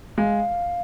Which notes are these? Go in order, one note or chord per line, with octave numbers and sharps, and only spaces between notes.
G#3 F5